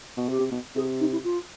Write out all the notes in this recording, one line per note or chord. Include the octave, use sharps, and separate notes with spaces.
B2
C3 G4
C3
B2
C3 G#4
D#4
E4
F4